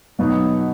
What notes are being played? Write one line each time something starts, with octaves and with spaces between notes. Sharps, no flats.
B2 F#3 B3 D#4